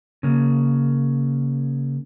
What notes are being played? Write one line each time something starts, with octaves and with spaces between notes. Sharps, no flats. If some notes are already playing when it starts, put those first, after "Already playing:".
C#3 A#3